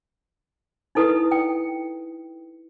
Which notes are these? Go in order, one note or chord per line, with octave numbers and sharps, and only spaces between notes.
D#4 E4 A4 B4 D#6
G5